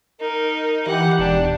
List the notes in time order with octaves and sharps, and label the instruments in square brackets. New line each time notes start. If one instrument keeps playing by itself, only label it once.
[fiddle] D#4 [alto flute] A#4
[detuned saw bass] E3 [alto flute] G4 [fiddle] F#5
[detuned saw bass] E1 [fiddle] D4